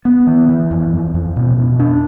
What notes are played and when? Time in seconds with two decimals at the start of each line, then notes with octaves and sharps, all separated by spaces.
0.05 B3
0.27 E3
0.49 E3
0.71 F2
0.93 F2
1.14 F2
1.36 B2
1.57 B2
1.80 D4